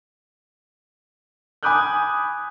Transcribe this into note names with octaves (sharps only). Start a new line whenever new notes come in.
G#5 B5 D6 D#6 F#6 G6